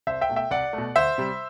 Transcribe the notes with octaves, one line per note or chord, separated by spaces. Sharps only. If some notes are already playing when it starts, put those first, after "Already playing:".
C2 C5 E5
E5 G5
B2 A3
E5 G5
C2 D5 F#5
A3
B2
D2 C5 E5
C3 G3